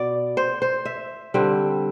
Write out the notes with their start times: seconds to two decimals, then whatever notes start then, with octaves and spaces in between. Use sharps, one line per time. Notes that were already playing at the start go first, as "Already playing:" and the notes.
Already playing: B2 B3 D5
0.37 C5
0.62 C5
0.85 E5
1.34 D3 G3 C4